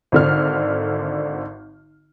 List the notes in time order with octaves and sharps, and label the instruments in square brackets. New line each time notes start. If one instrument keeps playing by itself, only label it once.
[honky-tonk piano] G#1 D3 F6